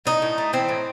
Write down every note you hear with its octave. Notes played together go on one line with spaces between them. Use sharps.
A2 D#4
A2
A3
E3 C4
A2